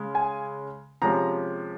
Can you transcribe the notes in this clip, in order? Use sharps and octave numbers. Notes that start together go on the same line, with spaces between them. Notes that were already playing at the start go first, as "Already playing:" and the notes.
Already playing: C#3 G#3
G#5
C3 F3 G#3 C#4 A#5